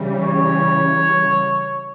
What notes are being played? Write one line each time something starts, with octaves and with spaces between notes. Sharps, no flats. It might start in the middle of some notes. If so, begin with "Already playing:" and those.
Already playing: C#3 E3 G3
C#5